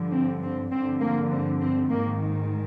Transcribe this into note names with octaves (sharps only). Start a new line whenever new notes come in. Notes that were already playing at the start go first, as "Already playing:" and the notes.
Already playing: G2 D3 F3
C4
C4
G2 D3 F3 C4
A#3
C4
C4
G#2 D#3 A#3